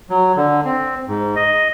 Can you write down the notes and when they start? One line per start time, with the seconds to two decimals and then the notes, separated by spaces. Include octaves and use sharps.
0.10 F#3
0.36 D3
0.65 C4
1.08 G#2
1.36 D#5